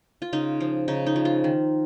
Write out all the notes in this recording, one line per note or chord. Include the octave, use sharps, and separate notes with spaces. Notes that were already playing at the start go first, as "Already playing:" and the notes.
F4
C#3 D#4
F3
C#3 D#4
D#4
F3
F4
D#3